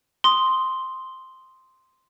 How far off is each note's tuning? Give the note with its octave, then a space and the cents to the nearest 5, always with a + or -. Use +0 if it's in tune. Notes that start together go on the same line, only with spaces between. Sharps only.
C6 +0 D#6 +0